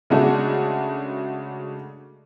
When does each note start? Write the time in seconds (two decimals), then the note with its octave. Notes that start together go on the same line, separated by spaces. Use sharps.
0.10 C#3 G#3 A3 D4 F#4